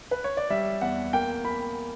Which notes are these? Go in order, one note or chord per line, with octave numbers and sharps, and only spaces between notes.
B4
C#5
D5
G3 E5
E2 F#5
A#3 G5
A#3 B5